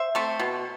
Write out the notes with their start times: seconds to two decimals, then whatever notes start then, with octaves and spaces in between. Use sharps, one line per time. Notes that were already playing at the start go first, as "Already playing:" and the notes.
Already playing: C5 E5
0.15 A3 C4
0.40 B2